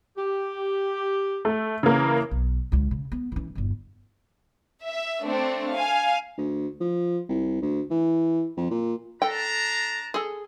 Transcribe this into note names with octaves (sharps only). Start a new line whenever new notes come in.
G4
A3
C#3 E3 A#3
B1
C#2 D3
C#3
B3
E3 C#4
G1 E2
E5
A3 C4 D4
F5 G#5
D2
F3
C2
D2
E3
F2
A#2
D4 A4 G5 A5 A#5
G#4 A4